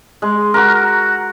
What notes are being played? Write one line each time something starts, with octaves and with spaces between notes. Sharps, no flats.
G#3
F#4 A#4